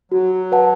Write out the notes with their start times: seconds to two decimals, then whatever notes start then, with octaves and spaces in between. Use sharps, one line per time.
0.12 F#3 F#4
0.52 B4 F#5 A5